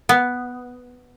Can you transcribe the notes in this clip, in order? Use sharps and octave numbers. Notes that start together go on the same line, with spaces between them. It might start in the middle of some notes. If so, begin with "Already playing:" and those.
B3